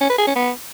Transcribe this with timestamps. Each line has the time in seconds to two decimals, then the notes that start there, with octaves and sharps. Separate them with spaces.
0.01 C#4
0.09 B4
0.18 G#4
0.27 C#4
0.36 B3